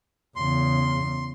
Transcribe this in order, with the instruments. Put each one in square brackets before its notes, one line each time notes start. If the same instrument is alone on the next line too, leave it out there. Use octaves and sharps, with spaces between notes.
[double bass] E2 C#3 [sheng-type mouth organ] C6